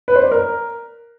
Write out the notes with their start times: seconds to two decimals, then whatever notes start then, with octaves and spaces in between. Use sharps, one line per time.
0.08 B4
0.16 C5
0.24 D5
0.31 A#4